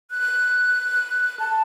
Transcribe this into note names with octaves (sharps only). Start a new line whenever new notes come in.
F#6
A5